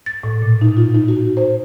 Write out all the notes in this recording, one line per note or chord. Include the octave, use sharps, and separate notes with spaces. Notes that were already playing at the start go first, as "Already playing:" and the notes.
A6
A2
A#2
D#4
F4
D#4
F#4
C5